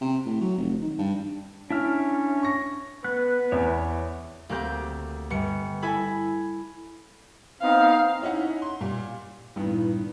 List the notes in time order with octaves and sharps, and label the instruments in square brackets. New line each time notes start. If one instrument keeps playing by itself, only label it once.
[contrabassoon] C3
A2
F#3
F1
D#3
G2
[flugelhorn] C#4 [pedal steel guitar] D4 E5 F6 [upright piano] E4
[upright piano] C#6 A#6
[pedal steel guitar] B3 F#6 [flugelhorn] B4
[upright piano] E2 [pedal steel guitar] C#5 E5
[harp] D2 A#3 C4 G4 G6
G1 C#7
E4 A4 G#5 B5
[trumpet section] B3 C4 D#4 [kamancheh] F5
[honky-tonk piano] C#4 D#4 E4 F#5
C6
A#2 G3
[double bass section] C#2 A#2 [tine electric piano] G2 [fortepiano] D#3 B3 [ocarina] E4